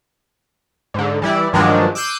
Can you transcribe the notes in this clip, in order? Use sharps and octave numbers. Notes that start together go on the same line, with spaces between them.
G#2 D3
E3 G3 E4 D5
G2 D#3 F3 F#3 G#3 D4
D6 E6 F#6 G6 C7 D#7